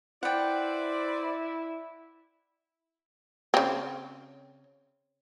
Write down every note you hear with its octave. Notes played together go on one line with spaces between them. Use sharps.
E4 B4 C5 D5 F#5 G5
C#3 C4